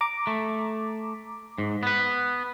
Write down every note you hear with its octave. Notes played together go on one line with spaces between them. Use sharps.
A#5 D6
A3
G#2
B3 B4